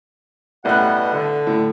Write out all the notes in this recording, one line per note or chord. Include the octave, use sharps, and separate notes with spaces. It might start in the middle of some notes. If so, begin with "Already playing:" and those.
A1 B2 G3 F#5 F#6
D3
A2